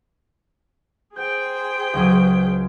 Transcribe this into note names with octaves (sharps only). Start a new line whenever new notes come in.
G#4 C5 G5 G6
C#2 F#3 D#6